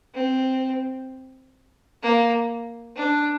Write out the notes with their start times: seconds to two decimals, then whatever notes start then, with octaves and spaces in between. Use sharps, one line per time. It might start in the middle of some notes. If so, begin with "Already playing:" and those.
0.15 C4
2.02 A#3
2.96 D4